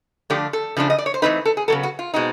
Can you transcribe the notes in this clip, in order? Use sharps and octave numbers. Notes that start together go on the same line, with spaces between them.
D3 F3 A3 D4 G4
A4
C#3 F3 A3 D4
D#5
D5
C#5
C5
E3 A3 C4 D#4 B4
A4
G#4
C#3 F#3 B3 A4
F#4
F4
B2 G#3 C4 D#4